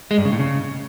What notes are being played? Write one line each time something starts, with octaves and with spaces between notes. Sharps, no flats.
G#3
G2
C#3
A2
C#3